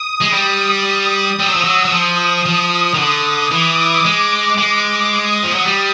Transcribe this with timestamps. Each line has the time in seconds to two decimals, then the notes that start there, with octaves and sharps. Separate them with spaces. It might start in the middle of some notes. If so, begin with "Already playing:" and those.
Already playing: D#6
0.21 G#3
0.33 G3
0.86 D#6
1.39 G3 E6
1.47 F#3
1.56 F3
1.64 F#3
1.85 F#3
1.92 F3 D#6
2.46 F3 D#6
2.94 D#3
2.98 D3
3.52 E3 D6
4.05 G#3
4.58 G#3
5.12 D#6
5.43 F3
5.54 F#3
5.65 G3